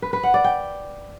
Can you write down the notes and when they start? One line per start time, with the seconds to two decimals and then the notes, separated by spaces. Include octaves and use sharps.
0.02 B4
0.13 B4
0.23 F#5
0.34 D5
0.44 G5